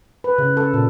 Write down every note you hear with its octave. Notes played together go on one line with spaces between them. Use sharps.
B4
C#3
A4
A#2